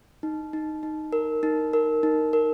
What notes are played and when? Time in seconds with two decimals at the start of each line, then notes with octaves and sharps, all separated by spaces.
0.23 D#4
0.53 D#4
0.83 D#4
1.13 A#4
1.43 D#4
1.73 A#4
2.03 D#4
2.33 A#4